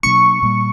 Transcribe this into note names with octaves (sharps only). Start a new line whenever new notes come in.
B2 F#3 A#3 D4 C#6
A#2 G3 A#3